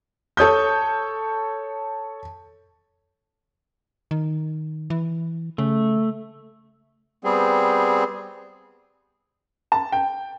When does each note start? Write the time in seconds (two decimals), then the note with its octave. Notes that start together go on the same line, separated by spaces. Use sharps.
0.37 A4 C#5 D#6 G6
4.11 D#3
4.90 E3
5.58 C#3 A3
7.24 G3 B3 C4 G#4
9.72 A5
9.92 G5